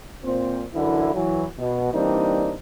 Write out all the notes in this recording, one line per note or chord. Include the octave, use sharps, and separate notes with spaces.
A#2 C4 C5
F#2 D3 E3 E4
E3 F#3
B2
E3 G3 A#3 C4 D4 D#4